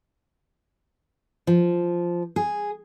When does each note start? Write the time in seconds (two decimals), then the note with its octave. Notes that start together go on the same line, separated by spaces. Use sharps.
1.47 F3
2.36 G#4